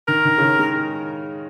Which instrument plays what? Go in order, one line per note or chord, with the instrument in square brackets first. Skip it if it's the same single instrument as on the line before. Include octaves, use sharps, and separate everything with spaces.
[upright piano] D#3 [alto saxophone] A#4
[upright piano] D#3
C#3
D#3
G#3